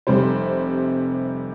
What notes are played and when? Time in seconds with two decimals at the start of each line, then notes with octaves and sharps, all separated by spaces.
0.07 F1 C3 G3 C5